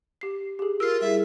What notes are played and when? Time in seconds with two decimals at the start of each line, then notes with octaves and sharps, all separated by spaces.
0.21 G4 C7
0.59 G4 G#4
0.80 F4 A#4 E6 F6 C7
1.01 G3 E4 G#4 E5